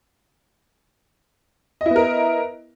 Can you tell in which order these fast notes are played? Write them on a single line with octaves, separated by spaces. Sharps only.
D#5 E4 B3 A#4